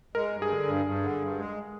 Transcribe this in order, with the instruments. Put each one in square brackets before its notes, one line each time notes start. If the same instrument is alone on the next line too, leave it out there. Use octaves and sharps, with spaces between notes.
[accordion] G#3 [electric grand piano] A#4
[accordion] G2
[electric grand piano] G#4
[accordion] D3
G2
G2
D3
G2
G#3